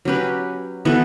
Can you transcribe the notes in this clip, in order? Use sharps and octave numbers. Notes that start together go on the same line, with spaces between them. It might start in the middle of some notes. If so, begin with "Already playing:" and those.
F#3 C#4 G4 B4
E3 B3 F#4 A4